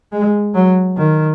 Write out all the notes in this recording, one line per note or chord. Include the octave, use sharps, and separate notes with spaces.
G#3
F#3
D#3